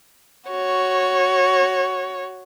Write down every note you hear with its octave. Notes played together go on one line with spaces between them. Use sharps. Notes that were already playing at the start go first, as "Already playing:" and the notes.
F#4 C#5